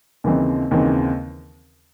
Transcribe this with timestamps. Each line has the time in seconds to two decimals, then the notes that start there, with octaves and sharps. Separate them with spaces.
0.24 D#2 C#3 E3 C4 D#4
0.71 D#2 C#3 E3 C4 D#4